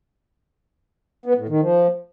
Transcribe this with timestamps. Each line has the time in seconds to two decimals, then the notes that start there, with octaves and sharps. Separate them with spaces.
1.26 B3
1.37 A2
1.49 D#3
1.61 F3